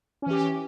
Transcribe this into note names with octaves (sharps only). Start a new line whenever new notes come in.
E3 C#4 G4